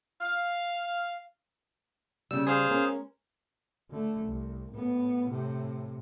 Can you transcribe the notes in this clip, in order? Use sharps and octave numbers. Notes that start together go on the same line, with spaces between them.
F5
C#3 G3 E6
G#4 C5 F5
G#3 C#4 A#4
D3 A3
C2
A2 B3
A2 C3